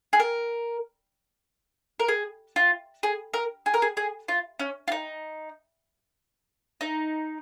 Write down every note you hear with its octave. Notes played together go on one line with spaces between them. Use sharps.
G#4
A#4
A#4
G#4
F4
G#4
A#4
G#4
A#4
G#4
G#4
F4
C#4
F4
D#4
D#4